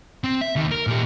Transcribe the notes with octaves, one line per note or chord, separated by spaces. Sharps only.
C4
E5
D#2 D#3
A#4
A#2 G4